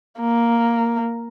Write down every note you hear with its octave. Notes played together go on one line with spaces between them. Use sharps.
A#3